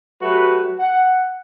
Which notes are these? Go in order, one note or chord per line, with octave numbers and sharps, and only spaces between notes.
F#3 A3 F#4 G4 B4
F#5